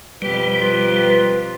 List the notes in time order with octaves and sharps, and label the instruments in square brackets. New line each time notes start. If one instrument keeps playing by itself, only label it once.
[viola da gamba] F2 B2 G4 [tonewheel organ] G3 [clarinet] B4
[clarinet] F4 [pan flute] B4